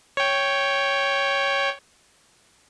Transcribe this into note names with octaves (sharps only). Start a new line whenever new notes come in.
C#5 G5